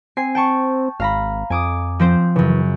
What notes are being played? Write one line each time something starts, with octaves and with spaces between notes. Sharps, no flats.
C4 G#5 C7
G5 A5 C#6
G#1 F5 A#5 B5
F2 G#5 D6 D#6
F3 C4 C5
F#2 C#3 E3